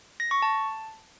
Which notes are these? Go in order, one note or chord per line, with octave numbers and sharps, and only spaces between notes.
A#6
C#6
A5